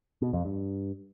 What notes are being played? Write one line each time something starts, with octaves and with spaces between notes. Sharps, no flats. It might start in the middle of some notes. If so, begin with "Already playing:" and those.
B2
F2
G2